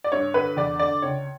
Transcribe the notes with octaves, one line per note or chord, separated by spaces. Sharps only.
D5
G2 C#5
D3 B4
E2 D5
D3 D5
C#2 C#5